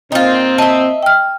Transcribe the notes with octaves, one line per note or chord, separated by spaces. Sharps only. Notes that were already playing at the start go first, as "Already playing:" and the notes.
A#2 C4 D#4 F4
D#5 E5 A5
G5 F6